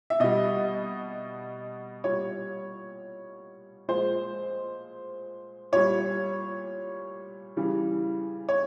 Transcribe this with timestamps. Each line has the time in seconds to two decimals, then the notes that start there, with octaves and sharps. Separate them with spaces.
0.10 E5
0.20 B2 G3 D#5
2.04 A#2 G3 C#5
3.88 A#2 F3 G#3 C5
5.72 A#2 G3 C#5
7.57 C#3 E3 G3
8.49 C#5